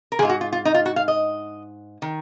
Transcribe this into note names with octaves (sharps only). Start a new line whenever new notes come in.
A#4
F3 G#4
G#2 F4
F#4
F4
F4
D#4
F4
F#4
F5
D#5
D#3